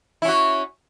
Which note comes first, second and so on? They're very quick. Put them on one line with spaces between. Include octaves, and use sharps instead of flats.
E4 C#4 F#4